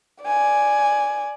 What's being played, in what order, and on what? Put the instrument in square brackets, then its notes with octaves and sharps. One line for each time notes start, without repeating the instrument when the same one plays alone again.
[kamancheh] D5 G#5